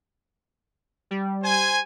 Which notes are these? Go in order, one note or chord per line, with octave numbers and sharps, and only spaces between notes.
G3
C5 G#5